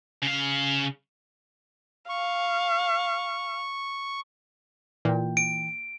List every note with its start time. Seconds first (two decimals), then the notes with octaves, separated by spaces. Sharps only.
0.22 C#3 F5
2.09 F5 C#6
5.05 A#2 E3 G5
5.37 D7